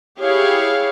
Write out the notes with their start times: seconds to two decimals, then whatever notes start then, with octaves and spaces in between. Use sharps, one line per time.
0.21 E4 G4 G#4 C#5 F5